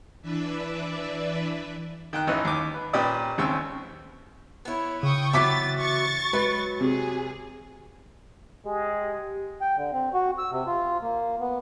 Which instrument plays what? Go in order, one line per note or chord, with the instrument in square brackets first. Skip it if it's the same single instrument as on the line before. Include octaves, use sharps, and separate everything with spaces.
[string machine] E3 D4 B4 D5 E5
[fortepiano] D#3 G5 F#6
G#1 E3 C#4 D#4 G#5 F#6
D#2 D6
B4
A#2 C#4 G4 B4 D5 D#6
G#1 D#2 C#3 C4 C#6 E6
[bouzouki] B3 E4 [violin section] C#5
[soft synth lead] C#3 [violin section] G5 C#6 D#6
[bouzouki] E3 F#3 B3 [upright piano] E5 D6 B6 [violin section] A6
[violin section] C#6 A6
[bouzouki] F#3 [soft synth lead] G#3 [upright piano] B4
[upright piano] C3 [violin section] G#4
[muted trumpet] G#3 [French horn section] G4
[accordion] G5
D3
C4
F#4
E6
C3
F4
A#3
B3